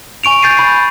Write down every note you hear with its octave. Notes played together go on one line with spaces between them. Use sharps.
G#5 C#6 D7 F7
G6 A6 C7 D#7
B5 C7